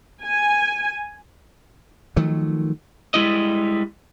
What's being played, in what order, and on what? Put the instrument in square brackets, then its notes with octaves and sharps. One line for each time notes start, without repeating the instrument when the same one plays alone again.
[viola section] G#5
[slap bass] D#3 F3 F#3 A3
[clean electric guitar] G3 G#3 E4 D#5